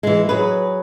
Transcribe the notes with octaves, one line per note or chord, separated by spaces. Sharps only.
E3 G#3
F#3 G#4 B4